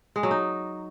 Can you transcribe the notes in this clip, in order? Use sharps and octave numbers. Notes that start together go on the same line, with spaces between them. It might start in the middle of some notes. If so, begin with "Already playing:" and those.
G#3
F#3
D#4